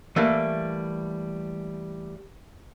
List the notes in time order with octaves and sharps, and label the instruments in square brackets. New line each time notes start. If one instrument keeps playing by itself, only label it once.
[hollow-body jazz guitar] E3 G3 A3 A#3